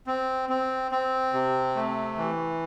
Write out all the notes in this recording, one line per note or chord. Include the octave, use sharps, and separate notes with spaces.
C4
C4
C4
C3
A3
E3